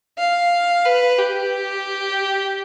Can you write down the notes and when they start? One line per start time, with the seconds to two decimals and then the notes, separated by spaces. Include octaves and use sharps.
0.18 F5
0.86 B4
1.19 G4